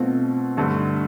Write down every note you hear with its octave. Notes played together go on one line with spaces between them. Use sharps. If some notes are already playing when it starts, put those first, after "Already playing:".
Already playing: B2 A3 C4 F4
G2 D3 A3